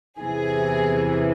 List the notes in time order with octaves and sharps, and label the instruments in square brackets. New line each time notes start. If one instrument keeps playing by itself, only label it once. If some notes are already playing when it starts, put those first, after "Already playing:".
[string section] E2 C3 E3 G#4